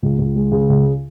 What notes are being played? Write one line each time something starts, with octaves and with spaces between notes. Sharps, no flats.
C#2
C#2
G#3
C#3
C#2